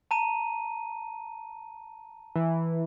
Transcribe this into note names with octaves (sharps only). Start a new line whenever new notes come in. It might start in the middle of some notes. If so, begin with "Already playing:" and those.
A5 A#5 D#7
E3